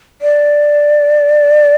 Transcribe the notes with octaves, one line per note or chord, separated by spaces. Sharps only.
D5